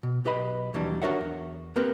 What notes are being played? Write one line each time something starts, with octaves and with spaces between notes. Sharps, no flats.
B2
B1 G4 B4 D#5 B5
D#2 E3 F#3 G3 D4
D4 F#4 A#4 C#5 E5 F#5
E2
A#3 C4 G4 A#4 B4